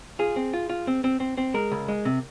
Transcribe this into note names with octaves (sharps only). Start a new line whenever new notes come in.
F4 G#4
C4
F4
F4
C4
C4
C4
C4
G#3 A#4
C#2
G#3
C3